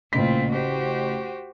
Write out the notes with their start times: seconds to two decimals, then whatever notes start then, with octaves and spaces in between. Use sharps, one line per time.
0.13 A1 A#2 C#3 C4 F4 B6
0.52 F#4 G4 C5